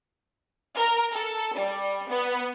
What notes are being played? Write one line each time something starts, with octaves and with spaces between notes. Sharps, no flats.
A#4
A4
G3
B3